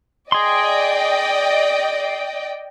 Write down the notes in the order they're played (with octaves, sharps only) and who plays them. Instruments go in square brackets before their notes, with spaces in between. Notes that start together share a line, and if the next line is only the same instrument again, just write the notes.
[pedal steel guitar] G#4 C6 [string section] D5 D#5 G5